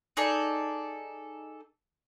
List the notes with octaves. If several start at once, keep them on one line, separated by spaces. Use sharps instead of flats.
D#4 G#4 A4 D5